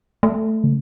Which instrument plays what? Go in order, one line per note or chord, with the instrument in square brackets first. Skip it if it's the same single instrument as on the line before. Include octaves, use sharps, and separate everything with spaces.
[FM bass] A3
C#3